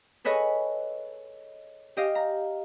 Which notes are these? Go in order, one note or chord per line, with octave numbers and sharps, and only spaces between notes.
G#4 A4 B4 C#5 D#5
G4 D#5 F5
A#5